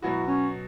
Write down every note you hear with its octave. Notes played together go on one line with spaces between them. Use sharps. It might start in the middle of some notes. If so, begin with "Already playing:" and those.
B2 F#3 B3 E4 F#4
C#4